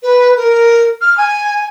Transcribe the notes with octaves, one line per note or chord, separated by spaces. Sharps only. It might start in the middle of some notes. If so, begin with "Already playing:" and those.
B4
A#4
F6
G#5